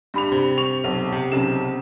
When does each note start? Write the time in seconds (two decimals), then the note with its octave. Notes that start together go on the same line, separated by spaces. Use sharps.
0.14 G2 B5 F7
0.32 C3
0.58 C#6 F7
0.84 B1
1.13 C3
1.32 B1 C#3 E7